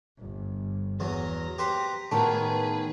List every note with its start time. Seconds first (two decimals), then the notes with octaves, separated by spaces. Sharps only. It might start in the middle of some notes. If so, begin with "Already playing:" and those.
0.18 G1
1.00 E2 F#3 A#5 A#6
1.58 G4 B4 C5
2.11 A2 D#3 B3 F#4 G#4 B4 A5